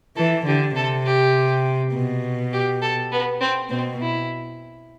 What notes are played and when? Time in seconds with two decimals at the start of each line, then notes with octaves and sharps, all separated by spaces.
0.17 E3 A4
0.46 D3 G4
0.76 C3 A4
1.06 G4
1.93 B2
2.53 G4
2.82 A4
3.12 B3
3.40 C4
3.70 B2 C4
4.00 E4